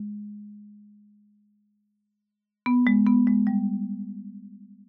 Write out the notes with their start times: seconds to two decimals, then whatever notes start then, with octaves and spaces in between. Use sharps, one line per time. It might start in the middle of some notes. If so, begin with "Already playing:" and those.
Already playing: G#3
2.66 B3
2.87 G#3
3.07 B3
3.27 G#3
3.47 G3